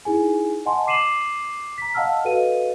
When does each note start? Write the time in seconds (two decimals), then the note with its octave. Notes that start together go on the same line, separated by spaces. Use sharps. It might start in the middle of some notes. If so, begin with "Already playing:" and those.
0.05 D#4 E4 G#4 G#5
0.66 D#5 F#5 G#5 A5 C6
0.87 D6 C7 D#7 E7 F#7
1.78 A#5 B6
1.94 D#5 F5 F#5 A5 E6 F6
2.25 F#4 A4 B4 D#5 F5 D#7